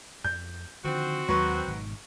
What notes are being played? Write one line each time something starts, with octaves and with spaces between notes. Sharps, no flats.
F2 G6
D3 D#3 F3 C4 F#4
D#2 F#3 G#3 B4 C#6
G#1 B2 D#3